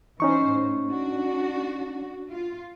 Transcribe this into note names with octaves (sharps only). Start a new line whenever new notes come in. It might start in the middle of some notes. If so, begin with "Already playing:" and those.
E3 C#4 D#4 C5 C#6
A2
D4 F#4
F4